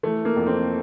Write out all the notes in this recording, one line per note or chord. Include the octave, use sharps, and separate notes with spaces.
E3 A3
A#3
F2
C4